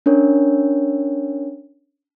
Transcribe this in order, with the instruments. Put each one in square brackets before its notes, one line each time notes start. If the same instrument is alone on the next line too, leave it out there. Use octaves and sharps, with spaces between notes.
[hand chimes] C#4 D4 A#4 C#5